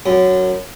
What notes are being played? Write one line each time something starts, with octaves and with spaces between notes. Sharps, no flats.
F#2